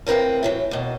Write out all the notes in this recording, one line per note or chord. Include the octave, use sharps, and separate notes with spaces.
A2 C4 A#4 B4 F5
A2 E3 F#3
D#2 B2